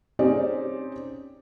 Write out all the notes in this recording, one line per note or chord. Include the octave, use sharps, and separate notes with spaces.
C4 C#4 D#4 G4 G#4 D5